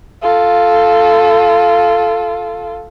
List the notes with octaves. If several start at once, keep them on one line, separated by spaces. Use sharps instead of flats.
F4 A4